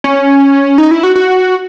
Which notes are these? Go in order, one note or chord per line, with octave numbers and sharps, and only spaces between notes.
C#4
D#4
E4
F#4
F#4